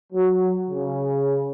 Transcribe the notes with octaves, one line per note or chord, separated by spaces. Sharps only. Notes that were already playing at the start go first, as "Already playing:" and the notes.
F#3
C#3